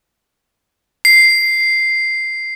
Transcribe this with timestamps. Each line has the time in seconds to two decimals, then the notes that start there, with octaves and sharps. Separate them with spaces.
1.05 C7